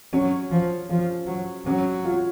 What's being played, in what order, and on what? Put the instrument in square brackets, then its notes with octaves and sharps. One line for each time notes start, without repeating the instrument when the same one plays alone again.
[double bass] F#3 [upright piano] C#4
[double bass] F3
[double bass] F3 [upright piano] F4
[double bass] F#3
[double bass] F#3 [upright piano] C#4
[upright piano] F4